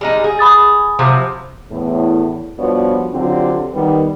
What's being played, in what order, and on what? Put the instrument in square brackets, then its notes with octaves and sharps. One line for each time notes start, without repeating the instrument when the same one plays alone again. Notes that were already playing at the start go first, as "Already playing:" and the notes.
[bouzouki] G3 G#3 D#4
G#4
[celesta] B5 D#6 A6
[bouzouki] C3 F3 F#3
[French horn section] E2 A2
G2 F3 B3 F#4 C#5 D5
D3 F#3 C4 D4 F4 G4
D#3 G3 B3